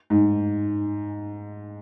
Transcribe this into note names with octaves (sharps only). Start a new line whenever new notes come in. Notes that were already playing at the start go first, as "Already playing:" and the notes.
G#2